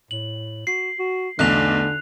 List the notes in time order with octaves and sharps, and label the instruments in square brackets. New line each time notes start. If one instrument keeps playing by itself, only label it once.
[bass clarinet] A2 [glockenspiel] F#7
[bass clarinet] F#4 [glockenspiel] C7
[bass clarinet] F#4
[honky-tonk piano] B1 E2 [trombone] D3 [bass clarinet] A3 [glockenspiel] F#6 F7